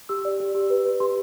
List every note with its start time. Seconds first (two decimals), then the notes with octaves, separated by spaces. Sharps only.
0.09 G4 E6
0.25 D5
0.40 G4
0.55 G4
0.70 B4
0.85 B4
1.00 G4 C6